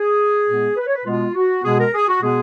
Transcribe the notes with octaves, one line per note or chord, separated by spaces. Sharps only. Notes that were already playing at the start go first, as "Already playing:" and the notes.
Already playing: G#4
A#2 G#3 B3
B4
C#5
B4
B2 G#3 B3 F4
F#4
B2 G#3 B3 G#4
A#4
G#4
F#4
B2 G#3 B3 G#4